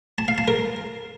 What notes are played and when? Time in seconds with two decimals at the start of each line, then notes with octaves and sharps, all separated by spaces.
0.18 A5
0.28 F5
0.38 A5
0.48 A#4